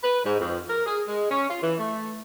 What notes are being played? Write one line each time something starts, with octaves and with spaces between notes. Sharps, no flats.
B4
G#2
F2
A#4
G#4
G#3
C#4
F4
E3
A3